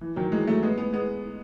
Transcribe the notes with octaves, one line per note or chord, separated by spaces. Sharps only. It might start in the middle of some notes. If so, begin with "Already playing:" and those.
E3
D#3 F#3
E3 G#3
F#3 A3
G#3 B3
G#3 B3
G#3 B3